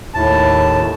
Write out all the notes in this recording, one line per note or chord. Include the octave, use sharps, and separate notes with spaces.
D#2 A2 A5